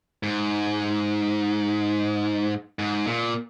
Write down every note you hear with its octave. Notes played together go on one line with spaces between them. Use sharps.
G#2
G#2
A#2